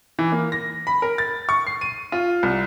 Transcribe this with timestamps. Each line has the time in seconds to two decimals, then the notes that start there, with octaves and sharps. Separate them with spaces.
0.19 E3
0.32 A#3
0.52 A#6
0.87 B5
1.02 A#4
1.18 A6
1.49 C#6
1.67 C7
1.81 D#7
2.12 F4
2.43 C2